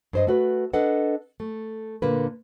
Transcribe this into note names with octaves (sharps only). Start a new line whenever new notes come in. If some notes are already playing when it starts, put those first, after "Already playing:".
G2 C5 D#5
A3 F#4 B4
D4 A4 B4 D#5 F#5
A3
A#2 D3 A#3 B4